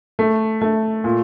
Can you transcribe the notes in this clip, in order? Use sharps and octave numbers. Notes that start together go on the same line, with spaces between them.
A3
A3
A#2